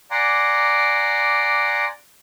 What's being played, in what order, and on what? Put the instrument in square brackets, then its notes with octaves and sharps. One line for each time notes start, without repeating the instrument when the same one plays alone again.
[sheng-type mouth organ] D5 F#5 G#5 A#5 C6 D6